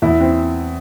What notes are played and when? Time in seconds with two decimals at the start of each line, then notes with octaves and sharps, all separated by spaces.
0.02 E2 E4
0.21 C4